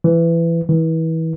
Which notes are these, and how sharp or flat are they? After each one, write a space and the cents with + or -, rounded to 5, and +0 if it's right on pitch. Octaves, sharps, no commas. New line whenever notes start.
E3 +20
E3 -30